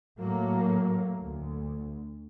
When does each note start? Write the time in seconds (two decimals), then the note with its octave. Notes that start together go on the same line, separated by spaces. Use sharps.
0.19 A2 F#3 A3 A#3
1.20 D2